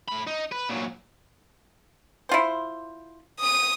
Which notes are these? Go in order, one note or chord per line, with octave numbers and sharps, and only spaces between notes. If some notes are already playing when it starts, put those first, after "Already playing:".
A2 B5
D#4
B4
A#2 F#3
E4 F4 C5
D#6 D#7